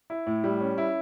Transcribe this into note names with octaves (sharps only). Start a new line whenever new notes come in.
E4
A2
G3
C#4
E4